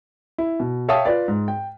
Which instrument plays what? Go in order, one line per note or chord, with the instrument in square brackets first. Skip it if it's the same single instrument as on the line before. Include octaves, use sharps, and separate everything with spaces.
[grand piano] E4
B2
C#5 E5 F5 G5 A5 D#6
F4 B4 D5
G#2
G5